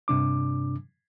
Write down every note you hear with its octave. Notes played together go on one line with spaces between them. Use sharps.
G2 C3 D4 D6